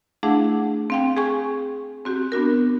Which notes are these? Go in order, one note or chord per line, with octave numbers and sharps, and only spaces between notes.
A3 D4 E4 G#4 F5 F#5
C4 F5 G5
G#4 G5 G#5 C#6
C4 F#4 G4
B3 D4 F#4 A#4